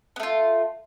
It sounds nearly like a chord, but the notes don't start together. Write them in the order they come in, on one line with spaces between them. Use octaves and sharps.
B3 A3 F4